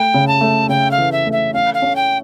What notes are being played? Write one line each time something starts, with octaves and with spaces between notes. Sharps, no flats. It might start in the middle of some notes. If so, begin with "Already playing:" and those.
Already playing: A3 G5
C#3
A5
A3
C#3 G5
F5
E3
E5
A3
E5
C#4 F5
F5
C#4
G5